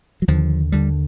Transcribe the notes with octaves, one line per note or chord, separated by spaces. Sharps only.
F#3
D#2 D3 F3
D#2 D3 G3